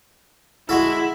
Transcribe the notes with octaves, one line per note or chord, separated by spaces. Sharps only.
G#3 E4 F#4 A4